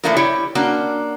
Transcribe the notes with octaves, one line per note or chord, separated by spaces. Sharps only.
E3 F3 A3 A#3 D4 A#4
E4 G4 C#5 D5
A#3 C#4 D4 F#4